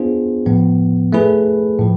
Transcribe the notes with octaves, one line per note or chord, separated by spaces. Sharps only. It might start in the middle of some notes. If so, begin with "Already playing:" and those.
Already playing: B3 D4 F4 G#4 C5
A2 F3 B3
A3 E4 G#4 B4
A2 F3